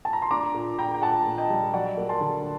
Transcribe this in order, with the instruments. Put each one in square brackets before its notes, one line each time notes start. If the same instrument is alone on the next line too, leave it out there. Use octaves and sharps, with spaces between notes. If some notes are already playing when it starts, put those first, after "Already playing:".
[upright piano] A5
A#5
C6
D4 A#5 D6
A#2
D4 G5 A#5
G5
A#2 F#5 A5
A#2
D#5 G5
G3
F#3 D5 F#5
A#3
A5 C6
D3